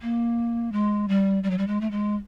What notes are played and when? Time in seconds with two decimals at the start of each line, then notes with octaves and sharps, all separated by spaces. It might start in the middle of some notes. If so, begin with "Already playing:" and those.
0.02 A#3
0.72 G#3
1.08 G3
1.43 G3
1.51 F#3
1.58 G3
1.67 G#3
1.81 A3
1.91 G#3